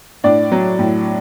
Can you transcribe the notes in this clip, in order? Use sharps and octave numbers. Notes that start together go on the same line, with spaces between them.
A2 D4 D5
F#3
A2